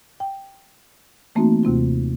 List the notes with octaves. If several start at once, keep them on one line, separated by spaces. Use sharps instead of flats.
G5
E3 A3 A#3 C4 D#4 F#4
D#2 C3 C4 F4